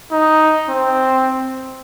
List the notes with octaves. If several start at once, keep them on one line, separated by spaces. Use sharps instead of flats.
D#4
C4